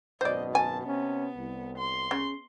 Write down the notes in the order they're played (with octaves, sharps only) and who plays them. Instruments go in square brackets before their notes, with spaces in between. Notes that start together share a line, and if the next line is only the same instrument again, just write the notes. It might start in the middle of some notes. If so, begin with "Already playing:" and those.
[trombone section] G#1 F#2 B2 [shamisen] C5 D5 [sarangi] D#5
[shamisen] G#5 [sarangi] A5
[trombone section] C3 C#4 [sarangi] B3
[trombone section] C2
[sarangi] C6
[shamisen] C#3